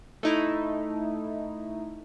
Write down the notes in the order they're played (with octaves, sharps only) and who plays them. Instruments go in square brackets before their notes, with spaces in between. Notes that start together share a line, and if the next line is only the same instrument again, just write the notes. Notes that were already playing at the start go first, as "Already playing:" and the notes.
[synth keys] A3 D#4 E4